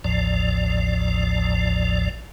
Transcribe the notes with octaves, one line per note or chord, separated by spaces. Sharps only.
A1 D#2 A2 F3 D5